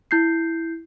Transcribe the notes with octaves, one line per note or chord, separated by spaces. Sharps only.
E4 G6 C7